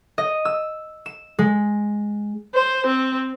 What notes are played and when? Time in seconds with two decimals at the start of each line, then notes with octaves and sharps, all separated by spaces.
0.18 D#5
0.45 E6
1.06 E7
1.39 G#3
2.54 C5
2.86 C4